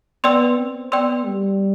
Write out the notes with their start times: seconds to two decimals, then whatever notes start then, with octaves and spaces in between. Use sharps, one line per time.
0.24 B3 D5 G5 C6 E6
0.58 C4
0.92 B3 D5 G5 C6 E6
1.26 G3